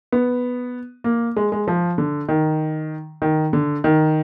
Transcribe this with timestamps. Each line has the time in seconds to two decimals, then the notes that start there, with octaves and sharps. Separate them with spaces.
0.12 B3
1.04 A#3
1.37 G#3
1.52 G#3
1.68 F3
1.98 D3
2.29 D#3
3.22 D#3
3.53 D3
3.84 D#3